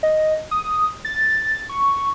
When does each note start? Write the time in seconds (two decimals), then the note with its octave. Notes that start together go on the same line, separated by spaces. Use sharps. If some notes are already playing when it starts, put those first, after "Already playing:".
0.03 D#5
0.51 D#6
1.05 A6
1.69 C#6